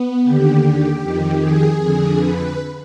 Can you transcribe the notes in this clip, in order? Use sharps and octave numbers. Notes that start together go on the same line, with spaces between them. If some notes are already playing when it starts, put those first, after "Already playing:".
Already playing: B3
D#2 D3 G4
F2 D#3
G#4
F2 D3
B4